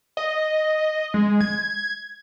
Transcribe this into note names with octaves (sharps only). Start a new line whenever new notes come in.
D#5
G#3
G#6